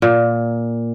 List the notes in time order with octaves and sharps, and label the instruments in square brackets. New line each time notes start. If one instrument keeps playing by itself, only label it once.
[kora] A#2